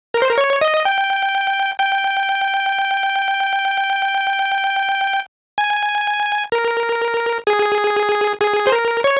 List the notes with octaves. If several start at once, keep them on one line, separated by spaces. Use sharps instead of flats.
A#4
C5
A#4
C#5
D#5
G5
G5
G#5
A#4
G#4
G#4
C5
A#4
C#5